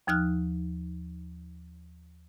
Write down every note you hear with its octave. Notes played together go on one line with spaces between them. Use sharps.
D#2 F3 D#4 F6 F#6